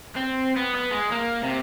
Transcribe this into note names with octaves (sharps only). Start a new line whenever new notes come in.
C4
B3
B3
G#3
A#3
C3